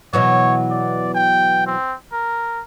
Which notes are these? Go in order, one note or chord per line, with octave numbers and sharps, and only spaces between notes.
B2 E3 F#3 C#5
D5
G5
C4
A#4